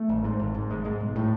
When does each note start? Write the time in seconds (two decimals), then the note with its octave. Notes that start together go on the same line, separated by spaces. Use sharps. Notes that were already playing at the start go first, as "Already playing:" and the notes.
Already playing: A3
0.09 G#1
0.24 G#2
0.39 G#1
0.55 G#2
0.70 G#1 G#3
0.85 G#2 G#3
1.00 B1
1.16 A2